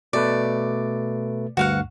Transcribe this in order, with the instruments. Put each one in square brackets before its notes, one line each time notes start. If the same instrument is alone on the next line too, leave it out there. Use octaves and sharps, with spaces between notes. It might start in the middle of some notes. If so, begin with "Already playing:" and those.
[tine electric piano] B2 A3 B4 [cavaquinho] D5
[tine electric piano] D2 G2 [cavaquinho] F#4 F5 F#5